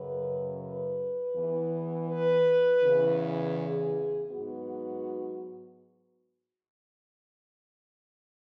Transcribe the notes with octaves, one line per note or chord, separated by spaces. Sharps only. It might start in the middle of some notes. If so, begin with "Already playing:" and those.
Already playing: F#2 C#3 F#3 B4
B4
E2 E3 B3
B4
E2 C#3 E3
G#4
G#2 F#3 B3 F#4